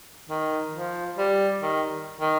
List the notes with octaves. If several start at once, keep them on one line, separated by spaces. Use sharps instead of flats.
D#3
F3
G3
D#3
D#3